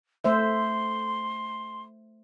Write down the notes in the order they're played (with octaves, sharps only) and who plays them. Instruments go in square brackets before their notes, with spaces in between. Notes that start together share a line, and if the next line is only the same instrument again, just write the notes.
[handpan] A3 C5 E5 [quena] C6